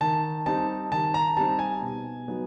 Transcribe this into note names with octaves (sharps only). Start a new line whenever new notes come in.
D#3 A5
G3 C4 D#4 A5
D#3 A5
A#5
G3 C4 D#4 A5
G#5
B2
F#3 B3 D#4